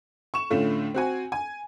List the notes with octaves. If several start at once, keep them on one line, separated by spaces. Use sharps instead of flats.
C#6 E7
A2 D3 A3 C#4 F4
C4 F#4 G#5
G#5